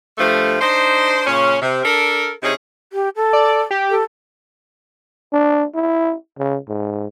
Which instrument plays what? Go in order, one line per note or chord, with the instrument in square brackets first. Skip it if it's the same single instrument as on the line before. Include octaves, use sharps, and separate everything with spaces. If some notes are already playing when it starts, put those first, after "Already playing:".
[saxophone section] G2 F3 A3
D4 D#4 C5
A#2 C#3 C#4
C3
D4 A4 A#4
C3 C#4 D#4 E4 G#4
[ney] G4
A4
[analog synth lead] D5
G4
[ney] A4
[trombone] D4
E4
C#3
G#2